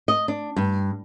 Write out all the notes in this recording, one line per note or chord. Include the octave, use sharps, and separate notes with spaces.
D#5
D4
G2